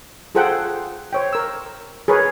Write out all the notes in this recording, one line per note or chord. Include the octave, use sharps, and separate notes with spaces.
F4 G#4 A4 C5 F#5 G5
C5 C#5 G5
A#4 E6
G#4 A#4 B4 C#5